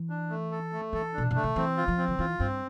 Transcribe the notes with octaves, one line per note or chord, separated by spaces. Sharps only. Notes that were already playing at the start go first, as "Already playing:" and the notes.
Already playing: E3
D4
A3
A4
A3
E3 A4
B2 D4
C3
A3
D3
E3 C4
F4
F3
C4
D3
E3 F4
G2 C4